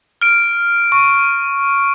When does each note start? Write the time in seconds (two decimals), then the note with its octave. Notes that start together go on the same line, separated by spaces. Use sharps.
0.22 F6 D7
0.92 C#6